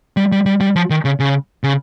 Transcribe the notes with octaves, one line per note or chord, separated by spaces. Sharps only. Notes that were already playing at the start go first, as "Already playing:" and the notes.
G3
G3
G3
G3
F3
D#3
C#3
C#3
C#3